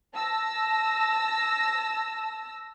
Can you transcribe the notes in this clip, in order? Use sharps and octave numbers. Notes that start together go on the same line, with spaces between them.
A5 E6 A#6